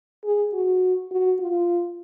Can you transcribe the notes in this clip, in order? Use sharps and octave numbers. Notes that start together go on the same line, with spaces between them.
G#4
F#4
F#4
F4